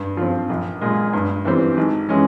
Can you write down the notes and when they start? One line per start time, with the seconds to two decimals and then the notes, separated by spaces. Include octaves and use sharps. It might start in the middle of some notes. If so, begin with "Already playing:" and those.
Already playing: G2
0.17 F3 C4
0.49 A#1
0.81 A#2 G#3
1.13 G2
1.45 E3 G3 C4
1.77 G#1
2.09 E3 G#3 C#4